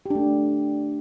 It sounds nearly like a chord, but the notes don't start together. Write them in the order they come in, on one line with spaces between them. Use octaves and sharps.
G4 D4 A3